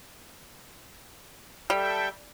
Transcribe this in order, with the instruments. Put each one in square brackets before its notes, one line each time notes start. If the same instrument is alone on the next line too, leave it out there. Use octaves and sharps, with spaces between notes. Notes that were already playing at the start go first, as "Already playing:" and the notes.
[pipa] G3 [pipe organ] A4 E5 G5